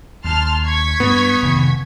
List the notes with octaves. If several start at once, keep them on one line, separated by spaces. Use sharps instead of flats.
D#2 A5 C6 F6
C#6 G#6 B6
G2 B3
F1 G#2 D#3